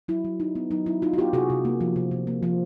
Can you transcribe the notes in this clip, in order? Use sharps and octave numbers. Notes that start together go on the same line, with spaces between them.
F#3 E4
F#3
D#4
B3
F#3 D#4
F#3 E4
D#4 F4
F#4
B3 F4 G4
C3 F#4 G#4
C3
A#3
F3
C3
C3
A#3
F3